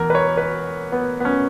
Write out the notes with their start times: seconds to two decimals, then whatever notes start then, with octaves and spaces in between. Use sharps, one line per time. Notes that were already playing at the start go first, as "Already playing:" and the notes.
Already playing: E2 A#4
0.10 B4
0.15 C#5
0.37 B4
0.92 B3
1.20 B3
1.25 C#4